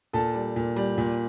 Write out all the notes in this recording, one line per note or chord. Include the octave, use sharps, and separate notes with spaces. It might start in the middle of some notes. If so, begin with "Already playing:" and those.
A#2 A4 A5
G3
A#2
G3
A#2